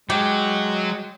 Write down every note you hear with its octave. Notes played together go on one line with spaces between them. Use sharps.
F#3 G#3 G4